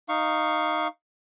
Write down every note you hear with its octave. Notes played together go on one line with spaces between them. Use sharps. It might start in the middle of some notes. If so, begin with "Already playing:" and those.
D#4 F5 C#6